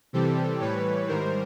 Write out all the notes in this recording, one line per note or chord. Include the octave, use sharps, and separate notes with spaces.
C3 E3 G3 C4 G4 A4
A2 E3 G3 B4 C#5
G#2 D#3 G3 A#4 C5